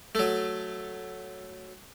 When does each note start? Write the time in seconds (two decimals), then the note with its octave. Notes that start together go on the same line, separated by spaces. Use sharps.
0.15 F#3 A3